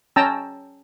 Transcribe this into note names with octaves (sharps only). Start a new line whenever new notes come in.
C#4 G5 A5 A#5 E6